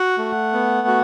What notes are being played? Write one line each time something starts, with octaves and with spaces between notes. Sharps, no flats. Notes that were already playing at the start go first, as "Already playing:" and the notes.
Already playing: F#4 F#5
A3
B3
F#4